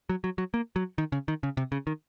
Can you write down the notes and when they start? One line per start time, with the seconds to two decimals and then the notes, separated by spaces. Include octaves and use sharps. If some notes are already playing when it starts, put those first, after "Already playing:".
0.09 F#3
0.24 F#3
0.38 F#3
0.54 A#3
0.76 F#3
0.98 D#3
1.12 C#3
1.28 D#3
1.43 C#3
1.57 C3
1.72 C#3
1.87 D#3